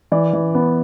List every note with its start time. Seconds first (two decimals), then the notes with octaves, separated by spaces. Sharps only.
0.12 E3 D5
0.33 E3
0.54 B3